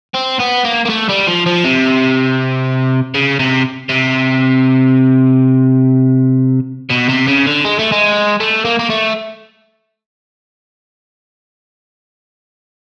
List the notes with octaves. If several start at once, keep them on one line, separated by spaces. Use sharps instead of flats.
C4
B3
A#3
A#3
A3
G3
F3
F3
C3
C#3
C3
C3
B2
C3
C#3
D3
G#3
A3
G#3
A3
A#3
A#3
A3